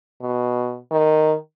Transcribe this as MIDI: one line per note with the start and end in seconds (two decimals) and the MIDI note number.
0.21 0.78 47
0.91 1.34 51